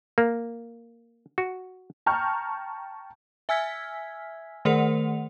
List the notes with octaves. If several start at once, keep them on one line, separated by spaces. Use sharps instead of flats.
A#3
F#4
G5 A5 A#5 C#6 F6 G6
E5 G#5 E6 F6 G#6 B6
D#3 A3 A#4 C5 F#5 F7